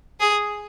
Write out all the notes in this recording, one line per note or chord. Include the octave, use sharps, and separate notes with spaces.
G#4